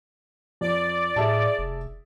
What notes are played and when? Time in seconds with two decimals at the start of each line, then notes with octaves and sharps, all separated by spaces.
0.61 F2 D5
1.16 A2 G#4 E5 A5
1.59 F1